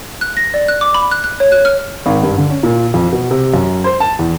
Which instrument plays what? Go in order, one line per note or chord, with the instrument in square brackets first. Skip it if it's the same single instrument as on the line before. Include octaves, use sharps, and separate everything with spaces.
[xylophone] F#6
A#6
D5
F#6
D6
B5
F#6
F#6
C#5
F#6
F6
[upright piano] G#1
G2
D3
C#4
A#2
F2
B2
C3
F#2
C5
A5
E2